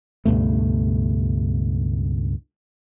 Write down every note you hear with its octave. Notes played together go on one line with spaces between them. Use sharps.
C#2 G2 B2 A3